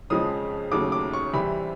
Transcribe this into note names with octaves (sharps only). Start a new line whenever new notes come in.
F2 C#3 F3 G#3 C4 D#6
D#2 C#3 F#3 A3 D6
D6
C#6
C3 E3 G3 C4 B5